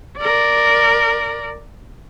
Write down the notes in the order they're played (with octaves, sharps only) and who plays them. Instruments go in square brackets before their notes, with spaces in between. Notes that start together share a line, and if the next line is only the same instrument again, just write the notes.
[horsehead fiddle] A#4 D5